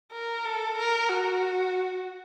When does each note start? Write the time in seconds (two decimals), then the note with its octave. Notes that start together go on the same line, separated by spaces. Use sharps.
0.12 A#4
0.45 A4
0.78 A#4
1.09 F#4